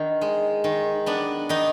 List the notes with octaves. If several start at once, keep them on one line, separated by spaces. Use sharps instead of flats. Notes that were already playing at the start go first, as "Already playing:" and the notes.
Already playing: D#3 B3 D4
G#3
D#3
B3 D4
D#3 D#4